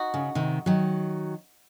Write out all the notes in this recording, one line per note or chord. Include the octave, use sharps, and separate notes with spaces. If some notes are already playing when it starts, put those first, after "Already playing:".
Already playing: D#4 F#4
C#3
C3 D#3
D#3 F#3